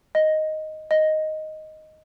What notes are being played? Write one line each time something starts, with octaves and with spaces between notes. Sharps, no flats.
D#5
D#5